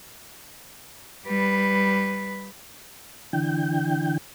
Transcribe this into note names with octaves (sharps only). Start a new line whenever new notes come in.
G3 B4
D3 E3 G5